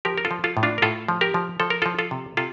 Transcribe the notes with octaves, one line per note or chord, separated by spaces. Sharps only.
F3 G4 A#4
A#4
F4 A4
F3
F4 A4
A2
D4 F4
A#4
A2 F4 A4
F3
G4 A#4
F3
F3 A4
A#4
F3 F4 A4
F4 A4
C3
C3 F4 A4